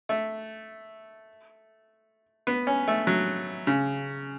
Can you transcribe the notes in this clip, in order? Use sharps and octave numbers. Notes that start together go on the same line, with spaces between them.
A3
B3
C#4
A3
F#3
C#3